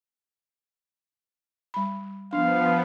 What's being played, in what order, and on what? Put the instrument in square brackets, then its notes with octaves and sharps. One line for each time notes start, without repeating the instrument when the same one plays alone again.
[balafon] G3 B5
[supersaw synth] F3 B3 [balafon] D4 [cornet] F5